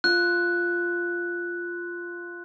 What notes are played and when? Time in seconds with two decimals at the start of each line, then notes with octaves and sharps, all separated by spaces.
0.04 F4 F#6